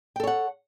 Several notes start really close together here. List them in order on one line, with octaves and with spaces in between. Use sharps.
G5 A4 C#5 F#5